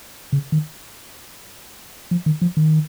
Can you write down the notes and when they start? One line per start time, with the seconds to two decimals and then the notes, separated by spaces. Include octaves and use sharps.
0.33 C#3
0.52 D#3
2.11 F3
2.26 D#3
2.42 F3
2.57 D#3